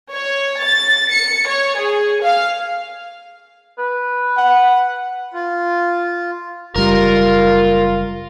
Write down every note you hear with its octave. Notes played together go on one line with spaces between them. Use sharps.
C#5
A6
C#7
C#5
G#4
F5
B4
F#5
F4
F#1 G3 F4 A#4